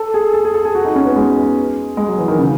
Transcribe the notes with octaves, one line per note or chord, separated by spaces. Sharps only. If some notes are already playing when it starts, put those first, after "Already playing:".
Already playing: A4
G#4
A4
G#4
A4
G#4
F#4
D#4
C#4
B3
G#3
G#3
F#3
E3
D#3
C#3